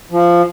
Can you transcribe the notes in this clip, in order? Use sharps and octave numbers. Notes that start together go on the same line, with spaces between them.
F3